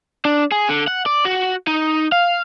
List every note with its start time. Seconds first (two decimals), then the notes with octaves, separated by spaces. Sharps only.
0.25 D4
0.52 G#4
0.69 D3
0.88 F#5
1.06 D5
1.25 F#4
1.67 D#4
2.12 F5